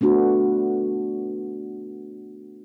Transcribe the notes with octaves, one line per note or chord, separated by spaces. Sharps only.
A3 B3 D4 F#4